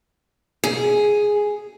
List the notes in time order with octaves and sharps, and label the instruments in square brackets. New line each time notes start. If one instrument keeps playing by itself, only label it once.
[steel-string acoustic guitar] G#4